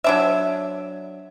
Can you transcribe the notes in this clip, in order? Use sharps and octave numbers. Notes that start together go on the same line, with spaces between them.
F#3 D4 E5